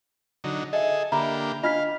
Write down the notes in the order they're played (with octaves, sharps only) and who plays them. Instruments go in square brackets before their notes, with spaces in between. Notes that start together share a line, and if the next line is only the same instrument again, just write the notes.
[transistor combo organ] D3 F#3 D#4
[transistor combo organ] G#4 A4 [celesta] D#5 E5
[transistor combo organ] D3 A#3 G4 [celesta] E5 B5 [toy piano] A#5
[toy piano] D4 F4 [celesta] D#5 F6 B6 [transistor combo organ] F5